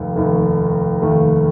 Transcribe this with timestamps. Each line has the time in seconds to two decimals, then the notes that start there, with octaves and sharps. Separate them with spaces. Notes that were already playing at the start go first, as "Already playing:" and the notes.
Already playing: F1 D#2 D#3 A3
0.15 F1 D#2 D#3 A3
1.02 F1 D#2 D#3 A3